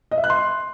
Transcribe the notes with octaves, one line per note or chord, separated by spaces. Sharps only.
D#5
E5
F#6
C6